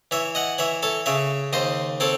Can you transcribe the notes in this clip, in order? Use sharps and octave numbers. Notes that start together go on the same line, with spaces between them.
E3 C#5 E5
D#5 F#5
E3 C#5 E5
A4 C#5
C#3 C#5 E5
D#2 C5 D#5
C4 A4 C#5